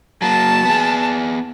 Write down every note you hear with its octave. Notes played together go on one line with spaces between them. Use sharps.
F#3 A#3 A5
B3 G#4